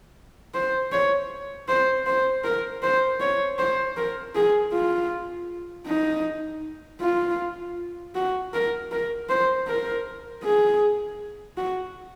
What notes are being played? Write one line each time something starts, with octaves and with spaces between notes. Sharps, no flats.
C5
C#5
C5
C5
A#4
C5
C#5
C5
A#4
G#4
F4
D#4
F4
F#4
A#4
A#4
C5
A#4
G#4
F#4